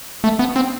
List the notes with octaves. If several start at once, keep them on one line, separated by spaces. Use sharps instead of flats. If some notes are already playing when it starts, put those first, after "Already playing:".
A3
B3
C4